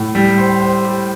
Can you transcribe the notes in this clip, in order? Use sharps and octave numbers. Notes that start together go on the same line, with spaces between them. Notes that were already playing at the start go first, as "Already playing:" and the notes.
Already playing: A2
G3
C5
C5
G4